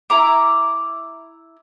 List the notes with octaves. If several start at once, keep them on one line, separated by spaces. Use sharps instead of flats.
E4 A#5 D6